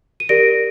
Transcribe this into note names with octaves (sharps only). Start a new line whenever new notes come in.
D#7
G4 A#4 D5 A#6 D7